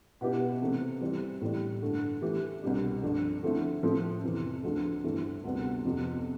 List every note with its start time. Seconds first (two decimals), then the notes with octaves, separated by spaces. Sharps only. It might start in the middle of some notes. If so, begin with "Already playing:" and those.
0.21 B2 B3 E4 G4 B4
0.62 C3 E3 A3 C4
1.01 E3 G3 C4
1.41 A2 E3 G3
1.82 G2 D3 A3
2.22 E3 A3 E4 G4
2.62 C2 B2 G3 D4
3.03 G2 F3 A3 D4
3.43 D3 F3 A3 C4 E4
3.83 A2 F3 C4 E4 A4
4.24 F2 C3 E3
4.64 D2 D3 F3 A3
5.04 G2 E3 A3 C4 E4
5.44 D2 C3 G3 B3
5.85 F2 C3 F3 B3